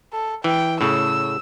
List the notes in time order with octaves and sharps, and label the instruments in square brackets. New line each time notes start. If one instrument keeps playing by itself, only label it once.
[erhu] A4
[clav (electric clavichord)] E3 [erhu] G5
[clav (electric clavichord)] A2 C#3 [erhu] E6